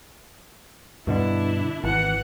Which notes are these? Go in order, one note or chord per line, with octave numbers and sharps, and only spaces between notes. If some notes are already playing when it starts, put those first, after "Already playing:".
G2 B2 D3 D4 E4
G#1 E3 F#5